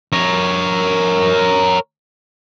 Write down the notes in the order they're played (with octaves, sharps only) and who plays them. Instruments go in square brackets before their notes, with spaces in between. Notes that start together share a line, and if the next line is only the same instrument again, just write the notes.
[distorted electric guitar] A#4 C#5